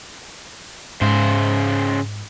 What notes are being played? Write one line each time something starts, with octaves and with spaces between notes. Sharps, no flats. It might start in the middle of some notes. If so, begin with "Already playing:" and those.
G#2 C#3 C5